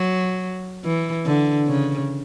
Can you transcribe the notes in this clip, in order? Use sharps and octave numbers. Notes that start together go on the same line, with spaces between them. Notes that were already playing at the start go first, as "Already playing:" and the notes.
Already playing: F#3
E3
D3
C#3